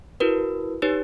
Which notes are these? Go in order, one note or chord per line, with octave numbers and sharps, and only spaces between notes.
E4 F#4 A#4 B4
D#4 G4 B4 C#5